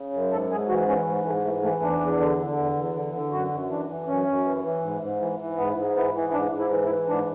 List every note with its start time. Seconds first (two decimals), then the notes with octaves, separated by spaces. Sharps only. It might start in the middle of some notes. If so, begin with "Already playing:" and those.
Already playing: C#3
0.13 F#2
0.31 G#2 A4
0.50 G#2 G#4
0.68 E3 F#4
0.88 E3 C#4
1.07 G#2
1.25 G#2 A3
1.45 E3 A3
1.63 E3 A3
1.82 E2 D4
2.00 E2
2.19 D3
2.38 D3
2.58 E2
2.76 E2
2.94 D3
3.14 D3
3.32 F#2 F#4
3.51 F#2
3.69 E3 D4
3.88 E3
4.07 F#2 C#4
4.27 F#2
4.45 E3
4.63 E3
4.82 G#2
5.02 G#2
5.20 E3
5.39 E3
5.57 G#2 B3
5.76 G#2
5.96 E3 B3
6.14 E3
6.33 G#2 D4
6.52 G#2
6.59 E4
6.70 E3
6.84 E4
6.89 E3
7.08 G#2 D4